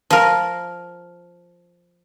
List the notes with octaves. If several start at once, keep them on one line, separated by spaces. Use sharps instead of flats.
F3 A#4